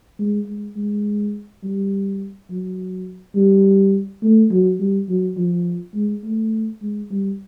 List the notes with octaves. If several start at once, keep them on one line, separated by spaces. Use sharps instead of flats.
G#3
G#3
G#3
G3
F#3
G3
A3
F#3
G3
F#3
F3
G#3
A3
G#3
G3